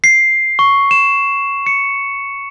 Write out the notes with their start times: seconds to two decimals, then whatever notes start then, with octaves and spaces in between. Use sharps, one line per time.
0.04 C7
0.59 C#6
0.91 E7
1.66 C#7